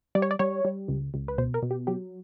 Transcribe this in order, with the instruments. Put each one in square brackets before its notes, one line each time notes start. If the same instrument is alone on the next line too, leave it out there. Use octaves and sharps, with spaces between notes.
[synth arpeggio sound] G3 D5
C#5
D5
G3 C#5
G3
C#2
C#2
B4
B2 C5
A#4
B2
G4
F#3 G4